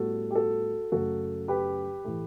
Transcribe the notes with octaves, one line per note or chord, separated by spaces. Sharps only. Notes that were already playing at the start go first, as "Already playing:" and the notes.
Already playing: A2 G3 B3 F#4 A4
G4
F#4 A4
F#2 C#3 F#3 A3 F#4 A4
G4 B4
A2 E3 A3